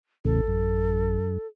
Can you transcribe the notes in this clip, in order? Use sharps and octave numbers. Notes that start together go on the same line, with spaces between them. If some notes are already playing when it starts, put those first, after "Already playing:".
A1 E2 A2 C#3 A4
F#2